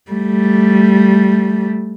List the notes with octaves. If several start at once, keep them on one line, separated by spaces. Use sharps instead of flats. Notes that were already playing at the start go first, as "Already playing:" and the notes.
G3 A3